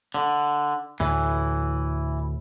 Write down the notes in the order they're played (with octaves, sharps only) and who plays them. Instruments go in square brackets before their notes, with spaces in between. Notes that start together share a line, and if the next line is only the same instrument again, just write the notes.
[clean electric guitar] D3
[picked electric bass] D2 A2 [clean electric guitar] E3